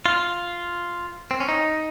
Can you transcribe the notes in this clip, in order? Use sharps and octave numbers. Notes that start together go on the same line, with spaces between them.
F4
C4
C#4
D#4